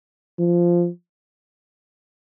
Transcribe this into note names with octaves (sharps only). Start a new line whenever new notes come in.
F3